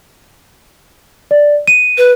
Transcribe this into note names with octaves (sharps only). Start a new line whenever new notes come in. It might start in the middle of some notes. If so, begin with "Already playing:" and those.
D5
D#7
B4